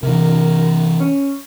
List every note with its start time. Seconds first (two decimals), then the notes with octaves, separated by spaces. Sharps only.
0.03 C3 E3 A#4
1.00 C#4